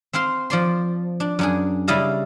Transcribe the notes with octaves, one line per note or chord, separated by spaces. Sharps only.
C4 C5 F5 C6
F3 D5 C6
D4
F#2 D4 G#4
C#3 G3 E4 D#5 F5 A5